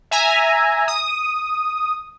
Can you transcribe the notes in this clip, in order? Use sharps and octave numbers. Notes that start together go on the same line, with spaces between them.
E5 G#5 A#5
D#6